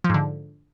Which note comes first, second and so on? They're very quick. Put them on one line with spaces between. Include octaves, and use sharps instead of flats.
F3 G#2 D3